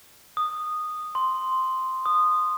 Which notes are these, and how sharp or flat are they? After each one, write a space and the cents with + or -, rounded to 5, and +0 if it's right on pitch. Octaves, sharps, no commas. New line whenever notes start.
D#6 -10
C6 -5
D#6 -15